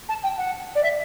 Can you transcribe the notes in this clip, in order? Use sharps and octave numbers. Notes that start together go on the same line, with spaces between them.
A5
G5
F#5
D5
E5